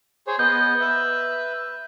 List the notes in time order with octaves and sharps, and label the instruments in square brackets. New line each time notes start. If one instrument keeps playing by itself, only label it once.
[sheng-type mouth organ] G#4 C5 C#5
[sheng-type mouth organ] B3 D#5 [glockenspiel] G6
[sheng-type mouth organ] B4 E5